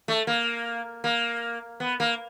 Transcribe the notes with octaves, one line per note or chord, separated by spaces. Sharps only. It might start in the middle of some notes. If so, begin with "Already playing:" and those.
A3
A#3
A#3
B3
A#3